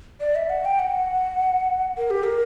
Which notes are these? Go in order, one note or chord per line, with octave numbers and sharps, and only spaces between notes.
D5
E5
F#5
G5
F#5
A#4
G4
A#4